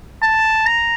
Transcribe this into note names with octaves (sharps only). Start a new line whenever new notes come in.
A5
A#5